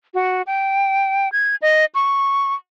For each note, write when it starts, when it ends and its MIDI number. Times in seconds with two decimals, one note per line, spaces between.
0.14 0.42 66
0.47 1.31 79
1.32 1.56 92
1.62 1.85 75
1.95 2.54 85